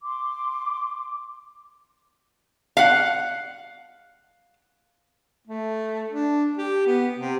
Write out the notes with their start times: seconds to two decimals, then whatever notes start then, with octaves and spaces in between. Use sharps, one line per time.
0.02 C6 D6
2.77 F5 F#5
5.47 A3
6.10 D4
6.57 G4
6.87 B3
7.18 C3